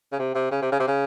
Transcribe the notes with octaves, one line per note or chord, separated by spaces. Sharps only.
C#3
C3
C3
C#3
C3
C#3
C3
C#3